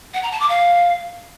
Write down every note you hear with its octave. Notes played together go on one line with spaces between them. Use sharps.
F#5
A#5
A5
D6
F5